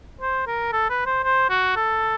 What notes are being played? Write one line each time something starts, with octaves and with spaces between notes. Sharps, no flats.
C5
A#4
A4
B4
C5
C5
F#4
A4